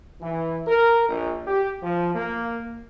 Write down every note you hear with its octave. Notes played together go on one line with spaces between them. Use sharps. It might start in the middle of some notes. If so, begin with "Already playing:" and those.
E3
A#4
A#1
G4
F3
A#3